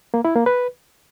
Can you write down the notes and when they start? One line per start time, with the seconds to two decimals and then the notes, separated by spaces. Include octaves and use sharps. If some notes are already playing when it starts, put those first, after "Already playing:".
0.14 A#3
0.25 E4
0.35 A#3
0.46 B4